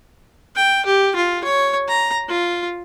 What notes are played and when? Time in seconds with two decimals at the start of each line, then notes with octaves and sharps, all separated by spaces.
0.56 G5
0.86 G4
1.16 F4
1.44 C#5
1.88 A#5
2.29 F4